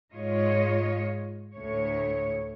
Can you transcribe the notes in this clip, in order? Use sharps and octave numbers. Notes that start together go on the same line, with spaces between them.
G#2 F4 C#5 D#5
D2 A2 C#5